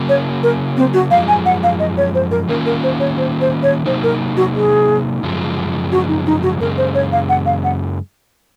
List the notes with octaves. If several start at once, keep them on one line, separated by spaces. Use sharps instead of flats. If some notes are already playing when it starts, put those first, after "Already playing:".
Already playing: C#3 F#3 A#3
C#5
A#4
C4
F#4
F#2 F3 G#3 F5
G#5
F#5
F5
D#5
C#5
C5
A#4
D#3 A#3 C#4 F4 A#4
A#4
C5
C#5
C5
C5
C#5
C3 F#3 A#3 D#4 C5
A#4
F#4
G#4
F#2 C#3 F3 G#3
F#4
D#4
D#4
F#4
F#2 C#3 G#3 A#4
C5
C#5
F5
F#5
F5
F#5